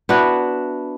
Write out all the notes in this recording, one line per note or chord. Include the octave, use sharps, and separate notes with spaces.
B3 D4 E4 F#4